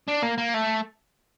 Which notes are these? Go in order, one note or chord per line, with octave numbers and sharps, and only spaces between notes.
D4
A#3
A#3
A3